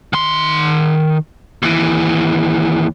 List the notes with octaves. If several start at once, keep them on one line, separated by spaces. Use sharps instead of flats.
D#3 C6
D#2 E3